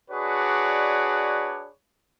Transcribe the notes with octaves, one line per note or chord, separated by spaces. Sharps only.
D4 F#4 G#4 B4 C#5 D5